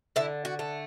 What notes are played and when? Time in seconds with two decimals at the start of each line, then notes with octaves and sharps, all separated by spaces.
0.16 D3 E4
0.45 F#4
0.59 A3